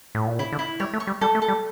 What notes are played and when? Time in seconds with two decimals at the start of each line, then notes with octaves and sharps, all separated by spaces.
0.15 A2
0.27 A#2
0.39 C#3 E4
0.52 D3
0.59 E4
0.80 G3 C#5
0.93 A3
1.00 C#6
1.07 G3
1.21 G3 A4
1.35 A3
1.42 A4
1.48 G3